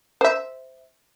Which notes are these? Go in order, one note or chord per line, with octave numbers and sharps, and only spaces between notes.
C5 E5